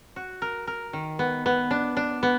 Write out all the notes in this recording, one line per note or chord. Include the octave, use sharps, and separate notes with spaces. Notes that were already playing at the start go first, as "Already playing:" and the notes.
F#4
A#4
A#4
D#3
B3
B3
D4
D4
B3